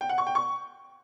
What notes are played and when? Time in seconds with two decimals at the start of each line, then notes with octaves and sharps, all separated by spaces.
0.01 G5
0.09 F#5
0.18 C#6
0.27 G5
0.35 C#6